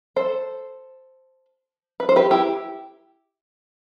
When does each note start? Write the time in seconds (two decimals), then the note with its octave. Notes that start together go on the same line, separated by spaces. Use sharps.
0.16 A4 C5
2.00 B4
2.09 C5
2.16 G4 B4
2.31 E4 G4